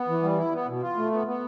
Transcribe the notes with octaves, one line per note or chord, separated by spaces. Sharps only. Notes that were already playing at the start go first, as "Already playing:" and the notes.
Already playing: B3
E3
G3
E4
B3
B2
F4
A3
B3
B3